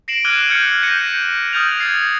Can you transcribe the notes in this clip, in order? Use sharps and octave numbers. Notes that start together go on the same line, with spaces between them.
A#6 C7 D7 E7 F#7
D6 F6 F#6 G#6 D#7 G7
F6 G6 G#6 C#7
G6 A#6 C#7 D#7
D#6 F6 G6 A6 F7
G#6 A6 C7